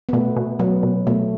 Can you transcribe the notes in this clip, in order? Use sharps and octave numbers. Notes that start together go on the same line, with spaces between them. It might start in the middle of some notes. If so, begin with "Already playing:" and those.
B3
B2 A3
B2
B2 F#3 B3
B2
B2 A3